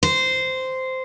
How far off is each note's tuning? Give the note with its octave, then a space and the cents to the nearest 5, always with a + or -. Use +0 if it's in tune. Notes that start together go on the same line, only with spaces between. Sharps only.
C5 -10